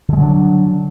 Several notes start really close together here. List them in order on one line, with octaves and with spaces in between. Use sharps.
D3 G#3 F#3 D4